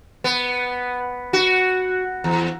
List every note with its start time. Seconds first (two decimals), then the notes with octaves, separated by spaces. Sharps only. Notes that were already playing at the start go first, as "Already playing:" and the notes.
0.24 B3
1.33 F#4
2.24 E2